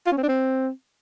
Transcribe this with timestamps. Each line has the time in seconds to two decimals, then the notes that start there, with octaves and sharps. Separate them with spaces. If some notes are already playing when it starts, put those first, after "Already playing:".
0.07 F4
0.12 C#4
0.18 C4
0.23 D4
0.29 C4